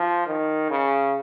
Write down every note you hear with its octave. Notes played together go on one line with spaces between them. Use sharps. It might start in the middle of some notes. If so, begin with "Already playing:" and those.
Already playing: F3
D#3
C#3